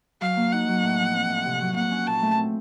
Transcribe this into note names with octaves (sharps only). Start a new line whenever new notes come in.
F#3 F5
A#3
D#4 F#5
F#3
A2
F3
C4
A2
C3
F#3
A#3 F#5
C#4
A#2 A5
A3
C4